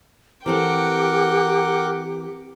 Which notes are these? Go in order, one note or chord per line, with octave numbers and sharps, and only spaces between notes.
E3 C4 G4 A4 A#4 F#5 G5 D6